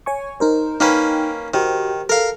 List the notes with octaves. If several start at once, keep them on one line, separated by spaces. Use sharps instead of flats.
C#5 G#5 C#6
D#4 A#4 C5
A#3 C#4 D#4 B4 G5
D#3 F#4 G4 C5
A4 A#4 F5